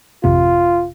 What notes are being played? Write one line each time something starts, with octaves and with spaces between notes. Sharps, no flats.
G#1 F2 C3 F4